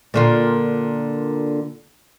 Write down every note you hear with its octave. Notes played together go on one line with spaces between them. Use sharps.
A#2 D3 F4